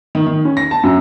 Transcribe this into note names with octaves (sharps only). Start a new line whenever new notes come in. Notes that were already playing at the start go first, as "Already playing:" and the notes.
D#3
D#3
C#4
A#6
A5
F#2